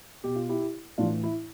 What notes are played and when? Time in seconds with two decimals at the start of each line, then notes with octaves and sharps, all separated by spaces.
0.24 B2 G4
0.36 F4
0.49 E4 G4
0.98 A2 E3 D4 F4
1.24 E4